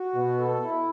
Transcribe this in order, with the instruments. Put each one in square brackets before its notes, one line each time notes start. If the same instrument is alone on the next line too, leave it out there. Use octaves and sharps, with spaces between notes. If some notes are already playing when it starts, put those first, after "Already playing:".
Already playing: [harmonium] F#4
[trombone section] B2 [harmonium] B3
[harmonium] A4
E4